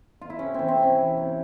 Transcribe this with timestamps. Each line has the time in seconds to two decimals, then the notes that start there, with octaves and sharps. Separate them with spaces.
0.21 F4
0.30 E4
0.39 C3 C#4
0.54 E3 C4
0.68 C4
0.78 C3
0.83 C#4
0.98 E3
1.17 C3